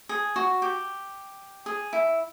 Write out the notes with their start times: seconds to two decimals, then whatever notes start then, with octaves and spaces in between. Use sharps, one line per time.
0.09 G#4
0.36 F#4
0.62 G4
1.66 G#4
1.93 E4